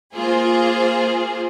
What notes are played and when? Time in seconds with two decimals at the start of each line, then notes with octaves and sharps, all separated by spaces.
0.14 A#3 F4 G#4 C5